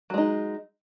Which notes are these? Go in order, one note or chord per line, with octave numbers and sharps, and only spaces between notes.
F#3 G#3 D#4